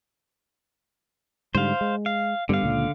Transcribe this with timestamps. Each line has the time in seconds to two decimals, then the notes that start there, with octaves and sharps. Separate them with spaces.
1.55 G#2 D3 G3 C5 F5
1.81 G#3
2.06 F5
2.49 G2 D3 G3 B3 F5
2.63 C#2 A#2